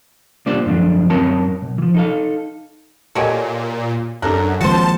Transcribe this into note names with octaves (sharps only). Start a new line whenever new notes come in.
G3 A#3 D4 F4 C5 D5
F#2 D3 F3 D4
F#2 F#3 C4 A#4 C#5 A5
B1
E3 F3
D#4 A4 F5
A#2 F#4 G4 A4 C#5 D#5 G#5
F#2 D4 A4 A#4 F#6
C#2 D#3 F3 A#3 C4 F#4 C5 A5